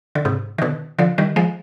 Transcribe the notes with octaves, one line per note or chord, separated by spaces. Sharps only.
D3
G#2 C3
D#3
B2 D3
D3 F3
D#3 G3
F3 G#3